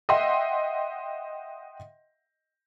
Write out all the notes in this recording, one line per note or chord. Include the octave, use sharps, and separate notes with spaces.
D#5 E5 F#5 G5 C6